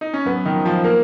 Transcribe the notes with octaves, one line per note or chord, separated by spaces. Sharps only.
D#4
C#4
F#2 B3
D#3 D#4
F3
F3 F4
A#3 A#4